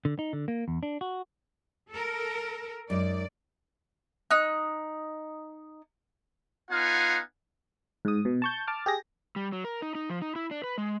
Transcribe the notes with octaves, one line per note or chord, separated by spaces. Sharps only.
D3
D#4
D3
A#3
E2
D4
F#4
A4 A#4
F#2 G#3 D#4 D5
D#4 F#6
B3 D#4 F4 F5 F#5 G#5
G#2 D#6
B2
A5 C#6 G6
A5 D6 F6
G4 G#4 A#6
G3
F#3
A#4
D#4
D#4
F3
D#4
E4
D4
B4
G#3